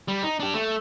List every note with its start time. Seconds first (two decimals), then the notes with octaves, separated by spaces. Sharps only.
0.08 G3
0.23 D#4
0.40 D4 G4
0.54 A3